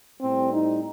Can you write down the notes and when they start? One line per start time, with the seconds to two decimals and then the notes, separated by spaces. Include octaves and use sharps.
0.19 A2 G3 C4
0.52 D#4